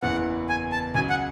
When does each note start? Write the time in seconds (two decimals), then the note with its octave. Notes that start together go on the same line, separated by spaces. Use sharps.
0.02 F#1 E2 C#3 E3 F#5
0.49 G#5
0.72 A5
0.95 C#2 C#3 F#3 G#5
1.10 F#5